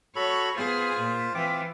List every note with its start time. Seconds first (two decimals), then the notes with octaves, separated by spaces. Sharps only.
0.16 F#4 A4 C#5 B5
0.56 B3 F4 G#4 C5
0.99 A#2
1.35 E3 C4 F4 D6